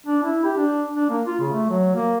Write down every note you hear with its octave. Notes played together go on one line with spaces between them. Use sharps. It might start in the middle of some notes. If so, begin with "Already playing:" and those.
D4
E4
G4
D4
D4
A#3
F4
C#3
A3
F#3
A#3